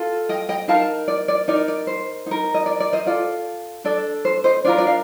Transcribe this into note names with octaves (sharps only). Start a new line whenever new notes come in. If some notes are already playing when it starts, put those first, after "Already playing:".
Already playing: F4 A4
D#5 G5
D#5 G5
D#4 A#4 F5 A5
D5
D5
D#4 A#4 D5
D5
C5
D#4 A#4
D#5
D5
D5
C5 D#5
F4 A4 D5
D4 A4 D5
C5
C5 D#5
D4 F4 A#4 D5
D5
F5